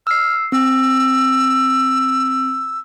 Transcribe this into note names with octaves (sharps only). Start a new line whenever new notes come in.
E6 F6 C7
C4 E6